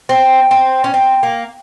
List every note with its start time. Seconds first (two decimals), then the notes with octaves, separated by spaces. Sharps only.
0.09 C4
0.51 C4
0.84 C#4
0.94 C4
1.23 A#3